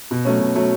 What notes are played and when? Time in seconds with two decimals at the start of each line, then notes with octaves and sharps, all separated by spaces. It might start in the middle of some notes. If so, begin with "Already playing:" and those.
0.11 B2
0.25 F#3 A3 C#4
0.40 B2
0.56 F#3 A3 C#4